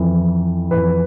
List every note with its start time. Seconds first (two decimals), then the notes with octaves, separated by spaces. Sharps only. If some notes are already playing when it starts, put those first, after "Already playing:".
Already playing: F2 E3
0.71 F2 E3 B4